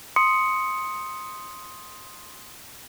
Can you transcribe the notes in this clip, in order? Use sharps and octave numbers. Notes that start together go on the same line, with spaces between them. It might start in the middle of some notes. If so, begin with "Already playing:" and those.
C6 D#6 C#7